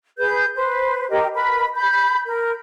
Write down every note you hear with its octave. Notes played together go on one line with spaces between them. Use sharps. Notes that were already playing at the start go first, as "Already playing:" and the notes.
G#4 B4 G6
B4 C5
G4 A#4 D#5
A#4 B4 B5
B5 G6
A#4